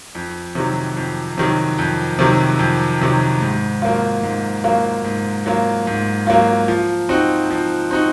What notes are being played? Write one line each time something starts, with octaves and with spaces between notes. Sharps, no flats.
F2
C3 D#3 F#3
F2
C3 D#3 F#3
F2
C3 D#3 F#3
F2
C3 D#3 F#3
G#2
F#3 A#3 F4
G#2
F#3 A#3 F4
G#2
F#3 A#3 F4
G#2
F#3 A#3 F4
F3
C4 D#4 F#4
F3
C4 D#4 F#4